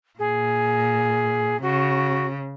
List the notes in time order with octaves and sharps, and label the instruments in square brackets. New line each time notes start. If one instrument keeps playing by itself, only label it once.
[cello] A#2 [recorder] G#4
[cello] C#3 [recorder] F#4